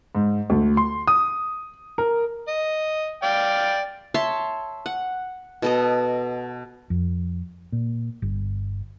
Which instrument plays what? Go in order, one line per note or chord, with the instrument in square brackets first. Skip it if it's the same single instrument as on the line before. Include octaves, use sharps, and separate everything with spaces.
[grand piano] G#2
D2
C6
D#6
A#4
[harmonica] D#5
D5 F5 G5
[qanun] C#5 E5 A5 C6
F#5
B2 A4 D#5
[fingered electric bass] F2
A#2
G1